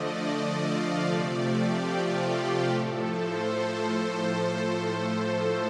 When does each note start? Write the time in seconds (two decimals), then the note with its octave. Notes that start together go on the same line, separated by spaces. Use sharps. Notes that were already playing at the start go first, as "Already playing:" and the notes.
Already playing: D3 F3 A3 D5 D#5
0.64 F5
1.04 C3 F3 A3 D5
1.47 G4
1.87 F4
2.29 G4
2.69 A2 F3 A3 A4
3.11 C5
3.52 C5